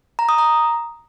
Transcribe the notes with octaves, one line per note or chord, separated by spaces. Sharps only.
A#5
D#6
A#5